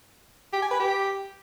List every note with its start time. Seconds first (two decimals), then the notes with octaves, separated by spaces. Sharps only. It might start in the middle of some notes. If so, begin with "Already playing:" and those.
0.53 G4
0.62 G#5
0.71 B4
0.80 G4